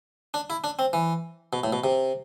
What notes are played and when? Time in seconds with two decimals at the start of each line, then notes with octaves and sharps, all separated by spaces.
0.34 D4
0.50 E4
0.64 D4
0.79 C4
0.93 E3
1.53 B2
1.64 A2
1.73 B2
1.84 C3